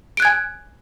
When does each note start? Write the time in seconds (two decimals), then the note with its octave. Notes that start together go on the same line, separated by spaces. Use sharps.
0.17 D7
0.20 F#6
0.22 G#6
0.25 G#5